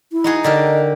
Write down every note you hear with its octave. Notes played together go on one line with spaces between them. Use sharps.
E4
D#4 F#4 G#4
D3 G4 A#4 D#5